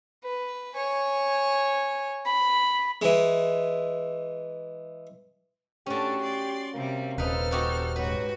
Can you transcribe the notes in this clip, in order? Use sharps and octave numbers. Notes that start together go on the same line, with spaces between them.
B4
C#5 G#5
B5
E3 G#3
A2 C#4 D4 F#4 G4 A4
D5 C6
C3 G3 A#3
D#1 D#4 A4 B4 C5 F6
D#4 F#4 G4
G#2 F#3 F#4 B4